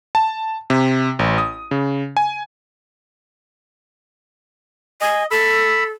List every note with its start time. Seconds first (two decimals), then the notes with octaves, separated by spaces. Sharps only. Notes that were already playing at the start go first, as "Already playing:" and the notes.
0.15 A5
0.70 C3
1.19 A1
1.38 D#6
1.71 C#3
2.17 G#5
5.01 D#5 G#5
5.31 A4 B5 E6